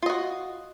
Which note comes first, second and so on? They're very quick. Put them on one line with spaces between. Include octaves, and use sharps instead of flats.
F4 D#5 F#4